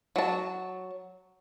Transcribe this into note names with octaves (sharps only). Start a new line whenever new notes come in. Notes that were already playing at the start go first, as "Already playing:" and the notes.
F#3 A5